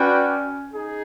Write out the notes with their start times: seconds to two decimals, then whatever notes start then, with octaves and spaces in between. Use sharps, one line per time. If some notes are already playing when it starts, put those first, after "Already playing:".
Already playing: C#4 F#4 B4 D5 G5
0.73 D#4 G#4